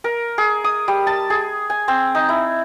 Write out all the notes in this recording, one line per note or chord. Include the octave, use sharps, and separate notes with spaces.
A#4
G#4
D#6
G3
A5
G#4
G#5
C4
D#4
E4